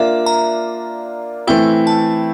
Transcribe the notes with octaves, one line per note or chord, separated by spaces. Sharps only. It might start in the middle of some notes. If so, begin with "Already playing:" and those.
Already playing: A#3 D4 F4 E5
A#5
E3 A3 C4 E4 G5
A5